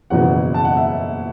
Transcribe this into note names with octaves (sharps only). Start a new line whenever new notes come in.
F#1 E2 B2 F#5
A5
F#5
E5